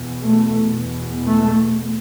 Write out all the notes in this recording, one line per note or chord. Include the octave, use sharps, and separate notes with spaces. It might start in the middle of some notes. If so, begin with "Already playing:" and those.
Already playing: E2 B2
A3
E2 B2
A3